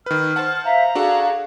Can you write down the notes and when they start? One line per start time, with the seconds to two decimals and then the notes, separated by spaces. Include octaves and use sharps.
0.06 D#3 B4 F6
0.36 C5 F#5 A5
0.65 E5 F5 A#5
0.95 D4 F#4 G#4 A4 F5